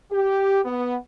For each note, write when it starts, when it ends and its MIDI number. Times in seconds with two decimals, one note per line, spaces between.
0.11 0.61 67
0.65 0.96 59